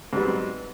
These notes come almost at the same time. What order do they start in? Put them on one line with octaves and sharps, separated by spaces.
G#2 G3 B3 F#3 C4